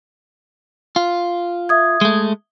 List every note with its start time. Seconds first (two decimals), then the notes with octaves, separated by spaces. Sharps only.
0.96 F4
1.69 E5 D#6 G#6
2.01 G#3 A3